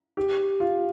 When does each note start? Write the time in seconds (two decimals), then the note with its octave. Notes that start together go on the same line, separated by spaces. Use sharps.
0.17 G4
0.60 F4